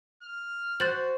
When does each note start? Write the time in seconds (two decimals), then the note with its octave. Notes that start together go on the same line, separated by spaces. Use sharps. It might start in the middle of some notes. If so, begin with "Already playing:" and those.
0.23 F6
0.80 F#4 C5 F#6 A6 F#7